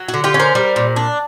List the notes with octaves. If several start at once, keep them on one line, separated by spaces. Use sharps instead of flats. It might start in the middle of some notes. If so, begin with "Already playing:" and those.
Already playing: F#3
F#4
D3
F4 G4
C#4
A#4 C5
G3
A#2
D4